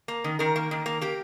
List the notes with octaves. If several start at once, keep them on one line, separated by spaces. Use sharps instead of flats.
A#3
D#3
D#3 A#4
A#3
D#3
A#3
A#3 G4